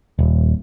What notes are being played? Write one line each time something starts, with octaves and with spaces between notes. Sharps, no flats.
D#1